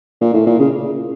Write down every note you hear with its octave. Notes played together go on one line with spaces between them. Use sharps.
A#2
A2
A#2
C#3